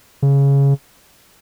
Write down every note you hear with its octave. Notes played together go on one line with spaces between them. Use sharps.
C#3